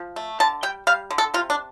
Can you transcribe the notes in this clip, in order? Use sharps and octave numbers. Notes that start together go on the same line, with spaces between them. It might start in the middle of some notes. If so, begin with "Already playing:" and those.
Already playing: F3
A3
D3 A5
G3 G5
G3 F5
D3
A4
C3 F4
D4